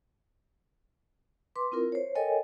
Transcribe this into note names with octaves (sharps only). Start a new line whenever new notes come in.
B4 C6 D6
C4 E4 F4 A#4
C5 C#5
A4 A#4 C#5 D#5 G5 G#5